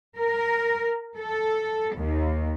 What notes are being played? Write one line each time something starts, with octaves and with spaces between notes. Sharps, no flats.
A#4
A4
D#2